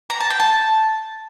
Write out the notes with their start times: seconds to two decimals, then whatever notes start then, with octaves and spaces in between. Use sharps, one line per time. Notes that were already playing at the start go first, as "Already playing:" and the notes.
0.10 A#5
0.20 A5
0.30 G5
0.40 A5